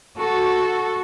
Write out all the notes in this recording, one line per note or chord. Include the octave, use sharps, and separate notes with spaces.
F#4 A4